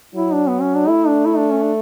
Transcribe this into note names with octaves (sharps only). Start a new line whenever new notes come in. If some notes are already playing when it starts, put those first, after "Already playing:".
F#3 E4
D4
B3
C#4
D4
A3 E4
D4
E4
D4
C#4
D4